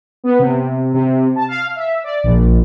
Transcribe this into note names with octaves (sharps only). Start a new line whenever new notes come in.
B3
C3
C3
A5
F5
E5
D5
A#1